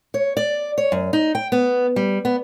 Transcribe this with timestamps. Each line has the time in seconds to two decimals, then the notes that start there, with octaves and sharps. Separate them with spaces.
0.14 C#5
0.37 D5
0.78 C#5
0.92 F#2
1.13 D#4
1.35 G5
1.52 B3
1.96 G3
2.25 B3